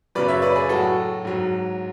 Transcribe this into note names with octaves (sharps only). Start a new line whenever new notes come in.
F#2 C#3 F#3 B4 D5
C#5 E5
B4 D5
G#4 B4
A2 F#3 F#4 A4
G#2 F#3